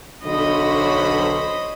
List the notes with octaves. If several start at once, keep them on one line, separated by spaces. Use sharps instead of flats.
B1 D3 C5 C#5 D#5 B5